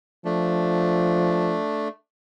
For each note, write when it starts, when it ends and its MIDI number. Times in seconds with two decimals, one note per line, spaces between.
0.25 1.58 53
0.25 1.88 57
0.25 1.88 62